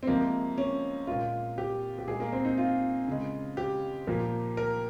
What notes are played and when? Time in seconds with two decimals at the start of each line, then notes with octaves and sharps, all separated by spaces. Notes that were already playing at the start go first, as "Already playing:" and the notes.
0.03 C4
0.07 C3 F3 G#3 A#3
0.58 C#4
1.07 A#2 G#3 F4
1.58 G4
1.98 G4
2.07 A#2 G#3 G#4
2.20 A#3
2.32 C4
2.45 D#4
2.58 F4
3.07 C#3 G#3
3.57 G4
4.07 A#2 F3 A#3
4.57 A#4